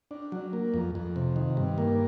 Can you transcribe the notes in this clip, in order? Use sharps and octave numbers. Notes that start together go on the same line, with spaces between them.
D4
F#3
A#3
F2
F2
C3
D#3
G2
A#3